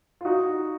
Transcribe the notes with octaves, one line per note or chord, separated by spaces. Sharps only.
F4
D#4 F#4